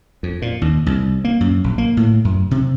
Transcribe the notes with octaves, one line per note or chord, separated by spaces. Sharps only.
F2
A#2
D#2
C2
A#3
F#2
A#1
A#3
A2
F#2
C3